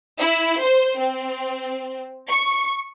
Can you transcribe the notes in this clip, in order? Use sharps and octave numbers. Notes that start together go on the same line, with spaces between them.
E4
C5
C4
C#6